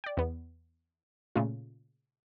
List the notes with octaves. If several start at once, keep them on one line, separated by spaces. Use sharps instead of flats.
D5 G5
E2 B3
A#2 C#3 A3 F4